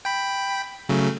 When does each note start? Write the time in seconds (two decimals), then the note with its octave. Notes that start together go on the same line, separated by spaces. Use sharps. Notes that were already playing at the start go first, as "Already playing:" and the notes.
0.05 G5 B5
0.89 C#3 F#3 A3